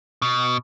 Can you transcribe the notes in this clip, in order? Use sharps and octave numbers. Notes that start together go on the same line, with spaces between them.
B2